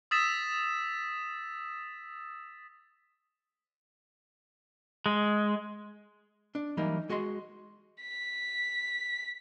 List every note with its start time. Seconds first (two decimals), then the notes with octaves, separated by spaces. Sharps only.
0.11 D#6 E6 A6 B6 E7
5.06 G#3
6.55 D4
6.77 E3 F#3 G3 A#3 D#4
7.09 G#3 F#4 G#4 D#5 C6
8.02 B6